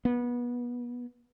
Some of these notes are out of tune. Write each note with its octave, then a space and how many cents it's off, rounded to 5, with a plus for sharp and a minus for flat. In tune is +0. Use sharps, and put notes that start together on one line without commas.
B3 -25